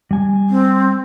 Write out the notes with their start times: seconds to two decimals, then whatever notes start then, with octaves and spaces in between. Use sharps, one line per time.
0.11 G3 G#5
0.49 C4